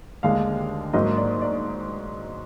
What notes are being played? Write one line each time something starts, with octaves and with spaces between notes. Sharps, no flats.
D#2 D3 G#3 D4 F5
G#2 F#3 A#3 D#4 D#5
D5
D5